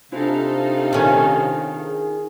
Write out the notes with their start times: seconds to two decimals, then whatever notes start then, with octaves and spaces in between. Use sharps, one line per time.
0.12 C3 D4 D#4 F4 A4 C5 F5
0.93 D#3 C#4
1.78 G#4